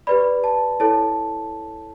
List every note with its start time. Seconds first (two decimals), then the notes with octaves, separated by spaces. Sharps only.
0.07 G4 B4 D5 B5
0.44 A5
0.80 E4 A4 C#5 A5